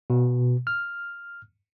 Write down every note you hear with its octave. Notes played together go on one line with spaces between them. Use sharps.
B2
F6